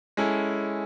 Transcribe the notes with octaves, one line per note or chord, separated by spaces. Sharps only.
G#3 C#4 E4 A4